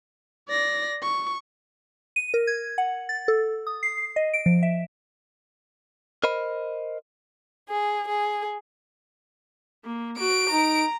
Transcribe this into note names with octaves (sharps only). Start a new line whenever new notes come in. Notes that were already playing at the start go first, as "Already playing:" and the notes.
D5 A#6
C#6
D#7
A#4
G#6
F#5
A6
A4
D#6
C7
D#5
D7
F3
E5
A#4 C5 D#5 B5
G#4
G#4
A#3
F#4 D7
D#4 A#5